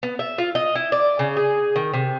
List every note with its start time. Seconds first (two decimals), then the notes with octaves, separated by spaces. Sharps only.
0.03 B3
0.19 E5
0.38 F4
0.55 D#5
0.75 E4
0.92 D5
1.19 C#3
1.37 G#4
1.76 D#3
1.94 C3